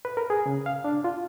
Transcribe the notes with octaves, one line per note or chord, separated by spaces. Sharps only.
B4
A#4
G#4
C#3
F5
D4
F4